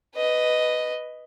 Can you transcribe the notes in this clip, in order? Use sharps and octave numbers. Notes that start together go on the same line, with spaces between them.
B4 D#5